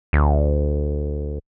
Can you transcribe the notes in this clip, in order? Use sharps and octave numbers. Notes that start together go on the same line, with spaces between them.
D2